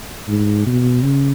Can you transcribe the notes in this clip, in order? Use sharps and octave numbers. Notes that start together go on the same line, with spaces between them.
G#2
B2
C#3